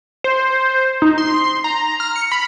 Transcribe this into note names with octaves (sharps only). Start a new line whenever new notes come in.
C5
D#4
C6
A#5
F6
C#7
B5